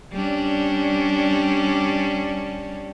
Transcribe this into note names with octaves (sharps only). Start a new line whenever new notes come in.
G3 C#4 D4